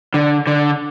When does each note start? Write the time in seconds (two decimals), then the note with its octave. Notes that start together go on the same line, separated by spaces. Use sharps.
0.14 D3
0.47 D3